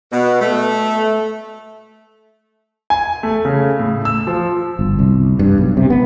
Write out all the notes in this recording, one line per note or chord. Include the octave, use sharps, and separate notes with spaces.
B2
A3
G#5
A3
C#3
A2
E6
F3
G1
C2
G2
B1
C3
B3